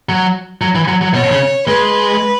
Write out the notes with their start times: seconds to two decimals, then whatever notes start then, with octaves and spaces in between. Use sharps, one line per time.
0.09 F#3
0.62 F#3
0.75 E3
0.88 F#3
1.01 F#3
1.14 B2 C#5
1.32 C#3
1.67 G#3 B4